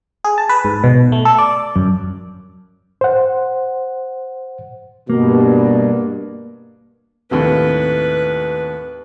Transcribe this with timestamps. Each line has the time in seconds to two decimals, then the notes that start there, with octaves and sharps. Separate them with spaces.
0.24 G#4
0.38 A5
0.49 B4
0.65 G#2
0.84 B2
1.12 A3
1.25 A4
1.39 D5
1.76 F#2
3.01 C5 F#5
5.10 G2 B2 A#3
7.31 D#2 A2 C3 B4